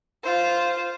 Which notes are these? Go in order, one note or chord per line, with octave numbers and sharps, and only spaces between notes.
F4 C5